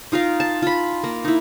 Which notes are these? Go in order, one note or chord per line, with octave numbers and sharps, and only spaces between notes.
D#4 F4 A#4 F5
A5
F4 B5
A#3
D#4 E4